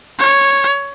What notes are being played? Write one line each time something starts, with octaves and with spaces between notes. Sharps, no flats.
C#5